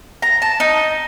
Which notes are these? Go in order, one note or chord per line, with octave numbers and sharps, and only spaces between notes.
A#5
A5
D#4